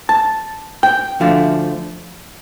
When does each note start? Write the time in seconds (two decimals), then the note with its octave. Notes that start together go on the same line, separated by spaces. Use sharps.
0.09 A5
0.83 G5
1.20 D2 D3 F3 A3